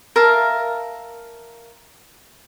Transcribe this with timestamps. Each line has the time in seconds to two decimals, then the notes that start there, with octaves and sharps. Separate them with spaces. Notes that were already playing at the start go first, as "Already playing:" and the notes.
0.16 A#4 E5 F5 A5